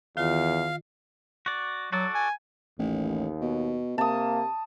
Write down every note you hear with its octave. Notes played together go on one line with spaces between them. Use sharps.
E2 D#3 F4 F5
F#4 D5
F#3 F#4 A4 D5
G#5
A1 D#2
B2
C3 A#3 A5 D#6